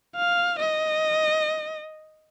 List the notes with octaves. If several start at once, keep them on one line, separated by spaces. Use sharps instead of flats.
F5
D#5